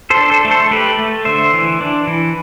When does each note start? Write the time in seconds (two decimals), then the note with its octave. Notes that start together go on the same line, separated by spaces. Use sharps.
0.10 A4 C5
0.17 D4
0.30 A4 C5
0.45 A3
0.51 A4 C5
0.71 A3 G4 B4
0.99 A3
1.25 D3 C5 E5
1.53 E3
1.81 D4
2.07 E3